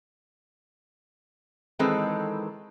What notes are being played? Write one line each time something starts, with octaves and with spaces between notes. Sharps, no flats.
D#3 E3 G#3 C4 A4 B4